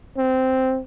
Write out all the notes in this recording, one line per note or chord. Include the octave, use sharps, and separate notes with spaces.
C4